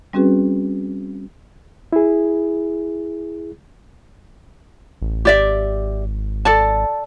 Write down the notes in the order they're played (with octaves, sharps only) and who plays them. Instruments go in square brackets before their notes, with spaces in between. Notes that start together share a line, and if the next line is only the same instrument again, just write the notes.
[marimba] G3 C4 C#4 F#4 G#4 B4
[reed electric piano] E4 G#4
[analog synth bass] A1
[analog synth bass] G#1 [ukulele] G4 D5 E5
[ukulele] A4 D5 A5